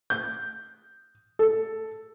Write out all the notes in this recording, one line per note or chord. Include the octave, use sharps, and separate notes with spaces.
G6
A4